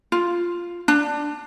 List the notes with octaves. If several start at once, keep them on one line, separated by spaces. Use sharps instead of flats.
F4
D4